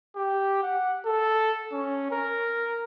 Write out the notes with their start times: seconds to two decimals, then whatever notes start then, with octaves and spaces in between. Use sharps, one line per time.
0.16 G4
0.63 F#5
1.05 A4
1.72 C#4
2.11 A#4